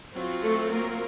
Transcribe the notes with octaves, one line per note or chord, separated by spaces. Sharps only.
F#3 C4 F4
A3 A4
A#3 A#4